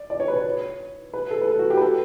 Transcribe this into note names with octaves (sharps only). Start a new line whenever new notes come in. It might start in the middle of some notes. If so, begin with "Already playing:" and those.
Already playing: D5
D5
C#5
B4
C#5
B4
A4
B4
A4
F#4
G4
B4
A4